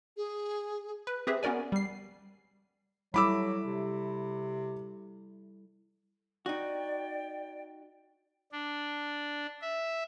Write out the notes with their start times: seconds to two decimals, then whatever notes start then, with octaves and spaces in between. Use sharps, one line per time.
0.17 G#4
1.07 B4
1.27 C4 G4 G#4 B4 E5
1.43 B3 C#4 F#4 A#4 D5 G#5
1.72 G3 C7
3.14 F#3 G3 E4 A4 B5 D6 E6
3.66 C3
6.46 D#4 F#4 D5 G5
8.52 D4
9.62 E5